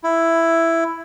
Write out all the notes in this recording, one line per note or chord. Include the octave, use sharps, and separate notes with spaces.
E4